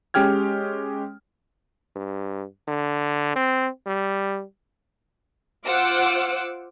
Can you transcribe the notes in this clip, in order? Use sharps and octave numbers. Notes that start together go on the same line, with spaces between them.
G#3 C#4 G4 G5 F6 G#6
G2
D3
C4
G3
F4 C5 F#5 D6 E6